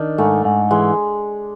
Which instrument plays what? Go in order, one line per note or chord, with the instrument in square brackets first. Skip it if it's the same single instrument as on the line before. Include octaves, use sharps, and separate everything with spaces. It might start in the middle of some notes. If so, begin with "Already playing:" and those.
Already playing: [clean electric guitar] D#3 [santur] D4
[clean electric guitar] G#2 [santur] A3
[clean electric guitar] G#2
[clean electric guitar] E3 [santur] G#3